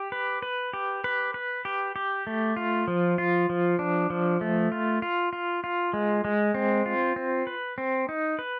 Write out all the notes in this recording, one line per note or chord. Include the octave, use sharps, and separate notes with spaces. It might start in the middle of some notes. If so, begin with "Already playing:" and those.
Already playing: G4
B4
B4
G4
B4
B4
G4
G4
A3
F4
F3
F4
F3
D4
F3
A3
F4
F4
F4
F4
G#3
G#3
C4
F4
C4
B4
C4
D#4
B4